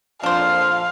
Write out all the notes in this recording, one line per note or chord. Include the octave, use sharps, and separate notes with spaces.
F2 A#2 F3 D4 C5 F5